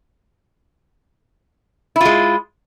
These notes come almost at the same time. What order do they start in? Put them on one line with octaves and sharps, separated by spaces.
E4 F4 G#3